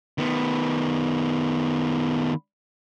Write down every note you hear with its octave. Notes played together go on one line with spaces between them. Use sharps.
D#3 B3